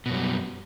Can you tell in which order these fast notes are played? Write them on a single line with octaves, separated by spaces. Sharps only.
B2 F#2 G3